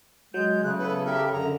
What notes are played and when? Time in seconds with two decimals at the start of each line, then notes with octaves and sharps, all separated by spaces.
0.34 F#3 G#3 G6
0.64 C#3 G#3 A3 F#6
0.79 B3 E4 A4 B4
1.06 G4 A4 A#4 E5
1.32 F#2 D3 A#5